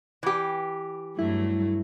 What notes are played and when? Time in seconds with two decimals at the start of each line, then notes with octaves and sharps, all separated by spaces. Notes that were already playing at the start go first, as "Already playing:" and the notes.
0.23 E3 G4
1.19 G2 F#3 A3 E4